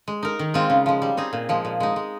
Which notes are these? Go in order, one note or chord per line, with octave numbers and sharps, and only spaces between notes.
G#3
D#4 A#4
D#3
G#3 C4 F4
C#3
F3 G#3
G3
C4 D#4 G#4
A#2
F3 G#3
A#2
G#3 D#4
G#3